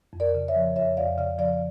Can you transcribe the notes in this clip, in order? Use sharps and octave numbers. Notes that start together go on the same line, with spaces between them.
F2
A#4 D5
C#3
C#5 E5
F3
F2 C#5 E5
F2 D5 F5
C#3 D5 F5
F3 D5 F5